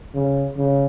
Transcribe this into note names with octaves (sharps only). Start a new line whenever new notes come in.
C#3
C#3